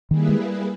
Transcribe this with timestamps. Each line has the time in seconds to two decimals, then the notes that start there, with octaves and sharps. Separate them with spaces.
0.10 D#3 G3 A#3 E4 G#4 B4
0.29 G#3